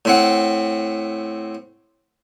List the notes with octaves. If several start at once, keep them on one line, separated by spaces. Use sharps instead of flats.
A2 C4 F#5